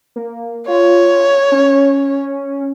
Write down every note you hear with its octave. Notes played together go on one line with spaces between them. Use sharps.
A#3
F4 C#5
C#4